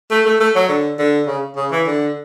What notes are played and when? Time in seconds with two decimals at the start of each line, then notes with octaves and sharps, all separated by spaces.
0.11 A3
0.26 A3
0.40 A3
0.55 F#3
0.69 D3
0.98 D3
1.27 C#3
1.56 C#3
1.71 E3
1.86 D3